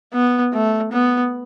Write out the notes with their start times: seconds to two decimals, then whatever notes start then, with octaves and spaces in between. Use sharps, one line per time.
0.13 B3
0.53 A3
0.92 B3